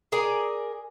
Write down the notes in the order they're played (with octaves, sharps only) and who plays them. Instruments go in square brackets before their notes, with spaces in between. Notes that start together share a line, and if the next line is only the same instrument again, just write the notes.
[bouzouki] G#4 A#4 D5 G#5